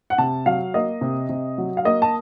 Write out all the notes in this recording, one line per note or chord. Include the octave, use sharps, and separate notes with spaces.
F#5
C3 A5
F#3 F5
A#3 D#5
C3
C3
F#3
F5
A#3 D#5
A5